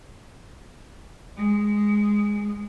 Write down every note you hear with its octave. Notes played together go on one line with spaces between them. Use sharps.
G#3